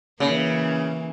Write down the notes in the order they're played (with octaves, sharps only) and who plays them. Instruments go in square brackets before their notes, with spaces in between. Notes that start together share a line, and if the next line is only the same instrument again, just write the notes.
[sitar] C#3 [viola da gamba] E3 A#3